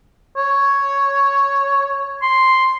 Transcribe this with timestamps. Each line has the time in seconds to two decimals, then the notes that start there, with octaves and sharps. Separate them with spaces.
0.37 C#5
2.22 C6